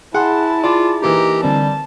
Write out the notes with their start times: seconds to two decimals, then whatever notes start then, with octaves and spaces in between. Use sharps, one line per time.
0.14 E4 G#4 F#5 A5 C6
0.64 F4 D5
1.02 E3 A#3 D#4 G4 A#5
1.43 D3 G3 C4 A5